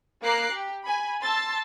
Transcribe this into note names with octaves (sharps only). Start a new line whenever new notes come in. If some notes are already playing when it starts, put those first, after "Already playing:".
A#3 A#5 D6 F#6 C7
G4
G#5 B5
A5 C6 E6 A6